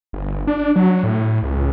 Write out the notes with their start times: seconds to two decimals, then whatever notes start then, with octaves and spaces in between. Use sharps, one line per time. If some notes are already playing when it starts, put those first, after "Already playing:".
0.13 G1
0.47 D4
0.76 F#3
1.03 A2
1.43 C#2